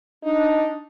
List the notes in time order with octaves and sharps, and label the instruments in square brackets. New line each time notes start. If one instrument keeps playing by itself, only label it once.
[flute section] D4 [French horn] D#4